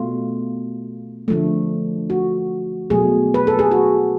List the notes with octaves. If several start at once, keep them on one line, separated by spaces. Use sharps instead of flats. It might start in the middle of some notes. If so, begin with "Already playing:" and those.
Already playing: B2 A3 F4
D3 F3 A3
F#4
B2 F#3 A3 G#4
B4
A4
G#4
F#4